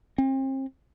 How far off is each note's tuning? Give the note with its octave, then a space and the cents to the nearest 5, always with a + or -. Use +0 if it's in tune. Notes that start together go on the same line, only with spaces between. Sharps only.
C4 +35